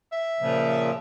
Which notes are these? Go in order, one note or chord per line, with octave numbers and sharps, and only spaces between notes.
E5
A#2 C#3 F3